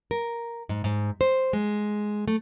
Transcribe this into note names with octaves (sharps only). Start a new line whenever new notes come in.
A#4
G#2
G#2
C5
G#3
A3